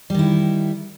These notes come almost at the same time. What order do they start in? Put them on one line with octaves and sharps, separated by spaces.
G3 D#3 E4